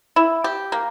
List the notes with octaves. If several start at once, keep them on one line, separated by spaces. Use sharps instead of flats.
E4
G4
A#3